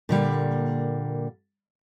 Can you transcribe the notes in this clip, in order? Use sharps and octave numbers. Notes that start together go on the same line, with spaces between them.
A#2 D3 G3 A#3